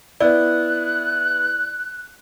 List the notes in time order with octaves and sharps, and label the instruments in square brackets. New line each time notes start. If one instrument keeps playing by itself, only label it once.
[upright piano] B3 E4 [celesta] D5 [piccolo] F#6